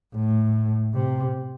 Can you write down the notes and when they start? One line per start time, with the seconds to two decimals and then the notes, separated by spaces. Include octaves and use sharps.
0.15 A2
0.94 C3